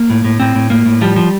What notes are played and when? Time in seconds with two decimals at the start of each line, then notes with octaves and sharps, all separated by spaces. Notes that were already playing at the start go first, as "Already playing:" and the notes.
Already playing: A#3
0.10 A2
0.24 A2
0.40 A2 C4
0.55 A2
0.70 A2 A#3
0.86 A2
1.01 F3 G3
1.16 F3